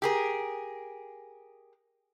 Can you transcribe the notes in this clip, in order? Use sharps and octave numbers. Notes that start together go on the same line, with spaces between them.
G4 G#4 A#4